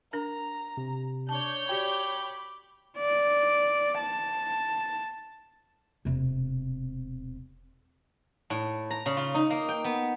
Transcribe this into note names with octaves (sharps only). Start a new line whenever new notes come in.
D4 A#4 A#5
C3
D4 C#5 A5 C#6 G6
F#4 G4 D5 G5 B5 D6
D5
A5
E1 C3
A2
A#5
C#3
F4
D#4
A#3
G5
B3